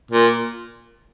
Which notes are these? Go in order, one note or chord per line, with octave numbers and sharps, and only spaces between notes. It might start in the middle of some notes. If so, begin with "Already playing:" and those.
A#2